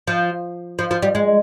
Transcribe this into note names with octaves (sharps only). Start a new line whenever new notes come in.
F3
F3
F3
G3
G#3